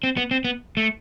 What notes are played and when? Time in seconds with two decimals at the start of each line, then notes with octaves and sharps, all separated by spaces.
0.03 C4
0.17 B3
0.31 C4
0.45 B3
0.77 A3